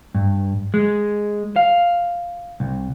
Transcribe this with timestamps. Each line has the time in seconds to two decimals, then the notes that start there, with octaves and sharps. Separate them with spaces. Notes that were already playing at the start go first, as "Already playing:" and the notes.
0.15 G2
0.74 G#3
1.56 F5
2.60 C2